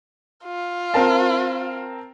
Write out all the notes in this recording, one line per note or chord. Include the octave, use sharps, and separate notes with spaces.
F4
C4 A#4 A5